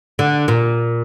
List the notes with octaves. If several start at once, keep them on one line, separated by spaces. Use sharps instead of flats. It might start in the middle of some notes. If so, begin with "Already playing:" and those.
D3
A#2